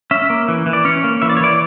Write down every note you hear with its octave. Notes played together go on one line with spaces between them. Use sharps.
C#4 E5
A#3
E3
E3
D5
C#4 C#5
A#3
E3 E5
D5
C#5
E3 D5